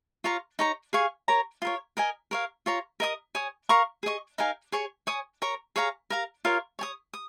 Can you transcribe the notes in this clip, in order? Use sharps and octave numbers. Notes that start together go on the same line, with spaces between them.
F4 C#5 F5 A#5
D#4 C#5 A#5
G#4 F5 G#5 C#6
A#4 C#5 A#5
F4 A#4 C#5
A#4 D#5 G#5
A#4 C#5 F5
F4 C#5 A#5
A#4 D#5 A#5 D#6
C#5 G#5 D#6
A#4 F5 A#5 C#6
G#4 D#5 C#6
D#4 A#4 F5 G#5
G#4 C#5 G#5 C#6
C#5 G#5 D#6
A#4 C#5 A#5
G#4 C#5 F5 A#5
A#4 F5 A#5
F4 A#4 C#5 F5
C#5 G#5 D#6
D#6